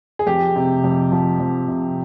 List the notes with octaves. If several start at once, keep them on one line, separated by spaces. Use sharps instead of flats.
G#4
F2 G4
C3
F2
F3
F2
C3